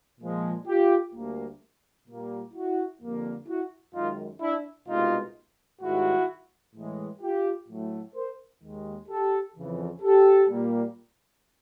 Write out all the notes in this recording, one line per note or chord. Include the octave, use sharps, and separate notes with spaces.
A#2 F3 G#3
F4 G4
D2 D3 G3 A#3
A#2 G3 A#3
E4 F#4
F2 D3 G3 A#3
E4 F#4
F#2 D#3 G#3 D#4 F4
D4 E4
C2 B2 G#3 D#4 F4
G#2 D#3 G3 E4 F#4
A2 E3 G#3
F4 G4
A2 F#3 A3
A#4 C5
D#2 D#3 G#3
G4 A4
F2 C#3 E3
G4 A4
A#2 G3 A#3